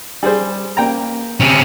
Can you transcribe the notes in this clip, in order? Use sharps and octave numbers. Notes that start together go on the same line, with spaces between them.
G3 G#4 C5
A#3 G5 A#5
C3 C#4